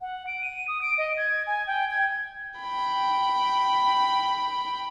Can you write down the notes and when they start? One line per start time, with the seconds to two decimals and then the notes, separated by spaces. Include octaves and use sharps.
0.01 F#5
0.27 D7
0.41 D#7
0.68 D#6
0.82 D7
0.98 D#5
1.17 G#6
1.47 G#5
1.67 G5
1.91 G#6
2.60 G5 B5